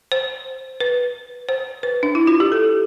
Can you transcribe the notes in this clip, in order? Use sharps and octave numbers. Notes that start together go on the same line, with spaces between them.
C5
B4
C5
B4
D4
E4
F4
G4
A4